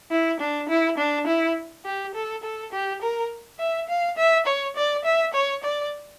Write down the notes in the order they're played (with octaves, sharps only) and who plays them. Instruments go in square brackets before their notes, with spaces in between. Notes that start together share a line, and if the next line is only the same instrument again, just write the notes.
[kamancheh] E4
D4
E4
D4
E4
G4
A4
A4
G4
A#4
E5
F5
E5
C#5
D5
E5
C#5
D5